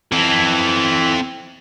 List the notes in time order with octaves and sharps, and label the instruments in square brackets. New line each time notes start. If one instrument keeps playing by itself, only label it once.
[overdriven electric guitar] E3 [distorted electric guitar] C4 A4